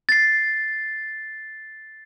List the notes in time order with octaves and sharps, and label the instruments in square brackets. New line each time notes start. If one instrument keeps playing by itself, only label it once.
[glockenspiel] A6 C7